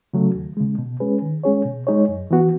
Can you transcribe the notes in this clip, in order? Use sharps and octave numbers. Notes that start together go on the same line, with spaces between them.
C#3 F#3 A3
D#2
C#3 G#3
B2
G#3 C#4 G#4 B4
D#3
G#3 C#4 G#4 C#5
B2
G#3 D#4 G#4 C#5
F#2
E3 B3 F#4